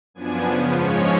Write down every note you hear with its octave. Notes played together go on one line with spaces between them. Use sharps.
F#2 F3 B3 D4 G#5
C#3 F3 B3
G#2 F3 G#3 C#4 C#5